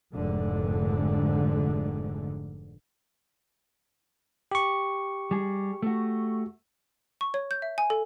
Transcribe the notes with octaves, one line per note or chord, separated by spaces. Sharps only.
F1 G#2 D3
G4 C#6
G3 G#4
A3 F#4
C#6
C#5
G6
E5
G#5
A4